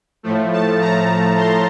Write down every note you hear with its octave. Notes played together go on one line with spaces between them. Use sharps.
A2 F3 A3
A5
A#5
C6